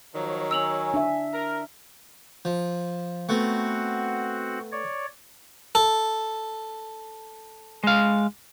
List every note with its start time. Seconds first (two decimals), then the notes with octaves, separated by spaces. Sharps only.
0.14 D#3 F3 F#3 C#5
0.51 G#5 E6 F7 F#7
0.94 D4 E5
1.32 A#4
2.45 F3
3.29 A3 B3 C4 F#4 F#5
4.72 C#5 D5
5.75 A4
7.84 G#3 F5